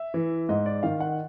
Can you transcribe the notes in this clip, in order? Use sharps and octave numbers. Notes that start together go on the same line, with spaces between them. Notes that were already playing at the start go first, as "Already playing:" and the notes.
Already playing: E5
E3
G#2 D#5
D5
D#3 F5
F#5